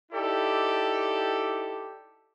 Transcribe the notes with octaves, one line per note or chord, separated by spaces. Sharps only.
D#4 E4 G4 A4 D5